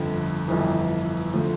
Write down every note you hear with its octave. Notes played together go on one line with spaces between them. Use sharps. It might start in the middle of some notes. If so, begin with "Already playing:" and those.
Already playing: G1 F2 D3
G1 F2 E3
D3 F3 A3